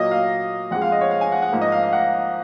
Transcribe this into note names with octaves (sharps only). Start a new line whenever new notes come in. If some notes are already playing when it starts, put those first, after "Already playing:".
Already playing: A#2 F#3 A#3 D#5
F5
F2 F3 G#3 F#5
F5
D#5
C#5
F5
G#5
F#5
F#5
G#2 F3 A#3
D#5
F5
F5
F#5